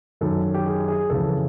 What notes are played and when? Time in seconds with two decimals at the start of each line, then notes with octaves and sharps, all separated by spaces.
0.21 F#2 D#3 A4
0.54 G4
0.66 G#4
0.88 G#4
1.10 F2 C#3 E3 A4